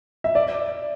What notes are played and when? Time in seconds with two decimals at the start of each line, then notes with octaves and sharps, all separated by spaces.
0.24 E5
0.35 D5